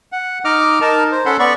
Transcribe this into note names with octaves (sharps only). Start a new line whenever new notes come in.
F#5
D#4 D#5 D6 F6
D#4 A#4 A5
C5
C#4 A4 F#5 B5 C6
B3 D5 B5 C#6